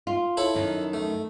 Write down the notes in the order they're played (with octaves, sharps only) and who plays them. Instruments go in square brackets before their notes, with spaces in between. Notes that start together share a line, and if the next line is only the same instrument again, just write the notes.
[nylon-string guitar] F4
[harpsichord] E4 A4 C#5
[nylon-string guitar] F#2 D#3
[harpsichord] A3